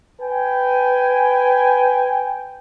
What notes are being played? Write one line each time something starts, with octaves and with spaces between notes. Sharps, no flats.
B4 G5 G#5